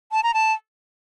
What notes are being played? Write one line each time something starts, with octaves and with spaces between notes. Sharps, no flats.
A5
A#5
A5